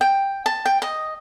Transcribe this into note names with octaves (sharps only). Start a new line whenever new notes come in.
G5
A5
G5
D#5